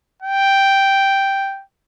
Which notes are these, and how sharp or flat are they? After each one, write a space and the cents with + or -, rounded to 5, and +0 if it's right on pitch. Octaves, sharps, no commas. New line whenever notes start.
G5 +0